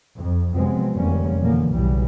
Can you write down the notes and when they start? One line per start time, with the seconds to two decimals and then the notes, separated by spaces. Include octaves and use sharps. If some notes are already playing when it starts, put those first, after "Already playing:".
0.17 F2
0.53 C3 F3 F#3 G#3 B3 C4
0.94 F1 E2 D3 G3 A#3 C#4
1.41 B2 D3 E3 F3 A#3
1.72 B1 A2 C#3 E3 F#3 G3